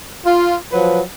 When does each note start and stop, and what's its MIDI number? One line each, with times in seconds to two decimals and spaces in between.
0.25 0.55 65
0.72 1.01 53
0.72 1.01 54
0.72 1.01 71